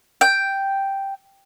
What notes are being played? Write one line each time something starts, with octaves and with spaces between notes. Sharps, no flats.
G5